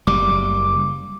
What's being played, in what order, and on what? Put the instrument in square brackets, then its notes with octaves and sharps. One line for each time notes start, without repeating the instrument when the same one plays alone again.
[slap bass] F#1 G3 [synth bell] D6